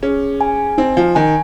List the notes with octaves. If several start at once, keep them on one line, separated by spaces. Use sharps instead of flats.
C#4 G#4
G#5
C4 D#4
F3
D#3 G#5